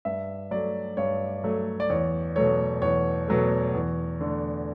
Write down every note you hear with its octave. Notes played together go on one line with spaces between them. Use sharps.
G2 E5
F#3 A3 D5
G2 C#5
F#3 A3
D5
E2 C#5
B2 F#3 A3 C#5
E2 C#5
B2 F#3 A3
E2
D3 A3